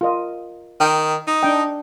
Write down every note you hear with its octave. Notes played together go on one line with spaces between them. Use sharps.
F4 A#4 D#5
D#3 G5
D#4
D4 G5